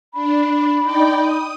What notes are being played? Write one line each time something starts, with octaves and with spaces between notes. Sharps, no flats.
D4 B5
D#4 D5 G5
D#6